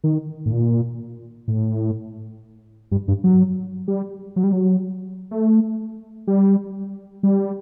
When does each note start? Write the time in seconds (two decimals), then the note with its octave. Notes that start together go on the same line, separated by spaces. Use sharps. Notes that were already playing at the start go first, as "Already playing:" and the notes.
0.04 D#3
0.46 A2
0.52 A#2
1.48 A2
2.91 G2
3.08 G2
3.24 F#3
3.88 G3
4.36 F#3
4.44 G3
4.52 F#3
5.31 A3
6.27 G3
7.23 G3